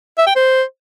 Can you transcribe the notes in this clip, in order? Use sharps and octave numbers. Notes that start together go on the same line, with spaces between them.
E5
G5
C5